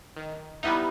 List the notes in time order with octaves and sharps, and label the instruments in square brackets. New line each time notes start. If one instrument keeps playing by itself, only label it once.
[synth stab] D#3
[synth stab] G3 B3 D#4 [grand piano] E4